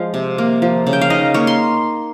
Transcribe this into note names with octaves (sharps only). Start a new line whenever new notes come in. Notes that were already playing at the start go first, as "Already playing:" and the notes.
Already playing: F3 G#3 F5
C3
A#3
F3
C#3
G5
F5
D#4 D#5
A#3 C#5
C6